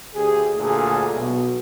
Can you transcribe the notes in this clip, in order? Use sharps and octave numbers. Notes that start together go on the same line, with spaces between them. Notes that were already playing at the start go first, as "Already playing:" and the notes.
D2 G4 G#4
D2 A#2 G#4 A4
B1 B2